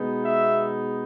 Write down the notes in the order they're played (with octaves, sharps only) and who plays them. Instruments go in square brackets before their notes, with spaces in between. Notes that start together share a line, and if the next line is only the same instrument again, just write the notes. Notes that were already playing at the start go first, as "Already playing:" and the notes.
Already playing: [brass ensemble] B2 G#3 B3 D#4
E5